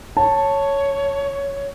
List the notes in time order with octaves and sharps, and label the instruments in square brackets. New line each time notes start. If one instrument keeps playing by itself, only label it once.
[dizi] C#5 [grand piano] A5